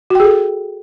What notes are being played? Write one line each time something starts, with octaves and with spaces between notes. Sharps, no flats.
F#4 G#4 A4 G5